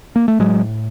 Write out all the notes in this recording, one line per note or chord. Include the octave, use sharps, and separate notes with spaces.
A#3
A3
A2 F#3 G#3